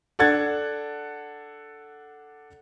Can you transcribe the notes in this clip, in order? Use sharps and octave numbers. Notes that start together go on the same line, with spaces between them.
D4 A4 F#5 F#6 G#6 A6